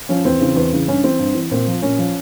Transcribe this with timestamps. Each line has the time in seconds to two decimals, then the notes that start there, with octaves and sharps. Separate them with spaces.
0.09 F3 C#4
0.25 E2 C4
0.40 C#3 E3
0.56 E2
0.72 C#3 E3
0.88 G2 C#4
1.04 E3 C4
1.19 G2
1.35 E3
1.51 A#2 C4
1.67 F3
1.82 A#2 C#4
1.99 F3